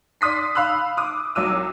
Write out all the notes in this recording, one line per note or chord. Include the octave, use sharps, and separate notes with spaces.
D5 C6 D#6 B6 C7
F5 B5 E6 F#6
D6 D#6
C2 F#3 D6 E6 D#7